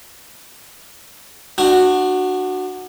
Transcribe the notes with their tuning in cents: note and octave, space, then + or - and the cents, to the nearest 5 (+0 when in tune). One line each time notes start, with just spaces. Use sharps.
D4 +35 F#4 +0